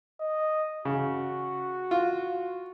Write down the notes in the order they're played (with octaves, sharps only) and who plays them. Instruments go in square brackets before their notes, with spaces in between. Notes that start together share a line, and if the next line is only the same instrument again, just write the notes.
[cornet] D#5
[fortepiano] C#3 [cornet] F#4
[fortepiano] F4